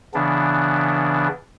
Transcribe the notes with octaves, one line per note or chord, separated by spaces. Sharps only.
C#3 E3 B3 D4